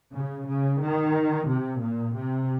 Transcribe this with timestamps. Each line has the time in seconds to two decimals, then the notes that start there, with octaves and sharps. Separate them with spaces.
0.14 C#3
0.48 C#3
0.82 D#3
1.48 C3
1.82 A#2
2.15 C3